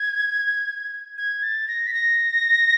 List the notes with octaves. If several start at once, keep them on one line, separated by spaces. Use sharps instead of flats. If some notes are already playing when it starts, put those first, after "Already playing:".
Already playing: G#6
G#6
A6
A#6
B6
A#6